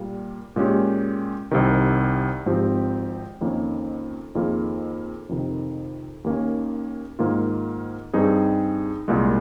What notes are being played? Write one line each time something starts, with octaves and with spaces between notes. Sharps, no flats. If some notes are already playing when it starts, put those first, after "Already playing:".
Already playing: A#2 G3 A#3
A#2 G#3 C#4 G4
C2 C3 D#3
G#1 G#2 F3 C4 G4
F2 D#3 A#3 C#4
F2 D#3 A#3 F4 G#4
F2 C3 D#3
D#2 D#3 A#3 C#4
G#2 D#3 A#3 F4
G2 G3 C4 D#4 G#4
C2 A#2 G#3